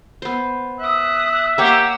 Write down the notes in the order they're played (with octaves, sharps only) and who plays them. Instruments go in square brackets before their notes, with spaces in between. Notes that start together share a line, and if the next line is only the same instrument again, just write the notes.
[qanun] B3 C5
[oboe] E5 [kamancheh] D#6 F#6
[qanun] A#3 C#5 F5 [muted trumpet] G4 [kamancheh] F#5 E6